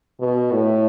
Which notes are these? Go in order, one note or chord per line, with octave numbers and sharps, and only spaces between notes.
B2
A2